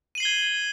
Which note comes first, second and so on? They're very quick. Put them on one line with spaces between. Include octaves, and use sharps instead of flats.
D#7 F#7 C7 G7 G#6